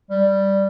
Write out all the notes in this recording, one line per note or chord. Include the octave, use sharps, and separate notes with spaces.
G3